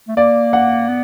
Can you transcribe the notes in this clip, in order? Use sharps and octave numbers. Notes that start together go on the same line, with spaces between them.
A3
A#3 D5
F#5
B3